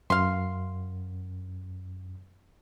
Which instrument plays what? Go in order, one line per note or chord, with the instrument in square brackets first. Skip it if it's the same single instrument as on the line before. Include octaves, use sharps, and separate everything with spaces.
[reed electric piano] F#2 [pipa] F5 C6